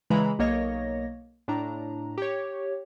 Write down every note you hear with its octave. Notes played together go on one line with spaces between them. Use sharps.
C#3 E3 G#3 A#5 B5
B1 A#3 C#5 D#5 A#6
A2 D4 A#5
G4 C#5